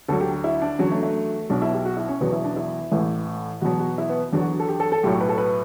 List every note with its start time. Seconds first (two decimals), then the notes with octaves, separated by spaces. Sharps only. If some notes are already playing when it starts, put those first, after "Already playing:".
0.09 D2 D3 F#3 A4
0.21 G4
0.44 E4
0.62 D4
0.79 E2 D3 F#3 C#4
0.92 A3
1.03 A3
1.49 B1 B2 F#3 D4
1.62 E4
1.73 G4
1.85 F#4
1.97 E4
2.08 C#4
2.20 E1 E2 B2 F#3 B3
2.33 E4
2.44 D4
2.56 E4
2.91 A1 A2 E3
3.62 E2 B2 F#3 F#4
3.80 F#4
3.98 E4
4.09 B3
4.33 E2 D3 F#3 D4
4.41 F#4
4.60 A4
4.69 G4
4.80 A4
4.92 A4
5.03 B1 A2 F#3 G4
5.21 B4
5.29 A4
5.38 B4